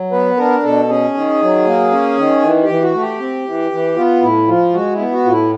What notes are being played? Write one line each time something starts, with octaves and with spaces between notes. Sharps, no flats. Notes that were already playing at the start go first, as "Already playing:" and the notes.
Already playing: F#3
B3 B4
D4 A#4
B2 A4
C#4 G#4
D#3
F#3
A#3
C#4
D#3
E3
G4
E3
F#4
A3
G4
C4
E3
E3
B3 F4
A2 E4
F3 F4
G#3 F#4
E4
B3
F#4
A2 F4
E4